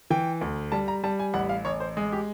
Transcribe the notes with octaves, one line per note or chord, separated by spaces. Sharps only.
E3 G5
D2
G3 A5
A#5
G3 A5
G#5
A1 F#5
F5
A1 C#5
C5
G#3
G4